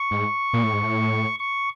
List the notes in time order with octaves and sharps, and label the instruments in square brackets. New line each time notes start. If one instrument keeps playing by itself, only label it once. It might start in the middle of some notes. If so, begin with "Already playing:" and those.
Already playing: [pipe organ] C#6
[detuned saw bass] G#2
A#2
A2
G#2
A2
[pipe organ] C#6